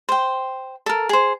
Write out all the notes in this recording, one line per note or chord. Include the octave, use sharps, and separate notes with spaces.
C5 G5
A4 A#4
G#4 C5